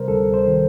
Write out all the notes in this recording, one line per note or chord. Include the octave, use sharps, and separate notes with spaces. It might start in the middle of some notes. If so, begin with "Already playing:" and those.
Already playing: C3 G3 A#4 C5
D2 A4
C5
D#3